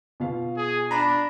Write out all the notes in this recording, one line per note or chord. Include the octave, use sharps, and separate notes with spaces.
B2 F4 F5
G#4
D4 A#5 B5 A#6